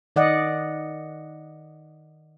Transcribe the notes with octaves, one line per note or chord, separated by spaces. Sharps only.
D#3 D5 D#5 F#5